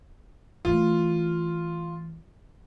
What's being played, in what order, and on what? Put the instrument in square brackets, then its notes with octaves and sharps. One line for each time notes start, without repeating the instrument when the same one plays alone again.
[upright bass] E3 A3 [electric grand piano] F4